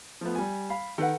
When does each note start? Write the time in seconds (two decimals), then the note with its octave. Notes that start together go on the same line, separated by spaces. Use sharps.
0.21 F3 A3 B3
0.35 G3 G#5
0.70 F5 B5
0.98 D#3 A4 B4 F#5